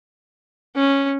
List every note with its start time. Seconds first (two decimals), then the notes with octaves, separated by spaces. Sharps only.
0.76 C#4